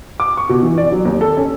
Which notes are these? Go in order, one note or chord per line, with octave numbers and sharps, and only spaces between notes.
D6
C#6
B2
E3
D5
F#3
D#2
A4
C#4